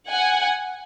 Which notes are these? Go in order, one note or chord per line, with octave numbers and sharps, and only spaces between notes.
F#5 G#5